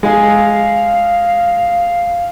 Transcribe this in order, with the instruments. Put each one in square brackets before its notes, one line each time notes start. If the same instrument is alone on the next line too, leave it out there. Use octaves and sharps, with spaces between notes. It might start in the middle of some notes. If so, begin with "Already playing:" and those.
[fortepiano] G#3 G#4 [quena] F5